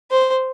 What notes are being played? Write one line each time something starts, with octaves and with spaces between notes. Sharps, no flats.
C5